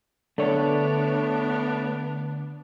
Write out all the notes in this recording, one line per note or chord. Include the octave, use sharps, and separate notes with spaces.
D3 A3 B3 D4 C#5